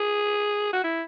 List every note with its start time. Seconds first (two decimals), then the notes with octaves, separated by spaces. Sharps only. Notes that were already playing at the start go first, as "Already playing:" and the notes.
Already playing: G#4
0.73 F#4
0.84 E4